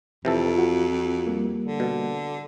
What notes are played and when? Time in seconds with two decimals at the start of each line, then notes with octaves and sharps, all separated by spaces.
0.25 F2 C3 E3 A4
0.55 F4 F#4
1.27 G3 A#3
1.65 D3
1.80 B2